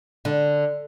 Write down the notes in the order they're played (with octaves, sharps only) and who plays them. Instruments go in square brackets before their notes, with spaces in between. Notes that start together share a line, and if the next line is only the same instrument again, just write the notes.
[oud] D3